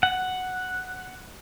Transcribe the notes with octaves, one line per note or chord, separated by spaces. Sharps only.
F#5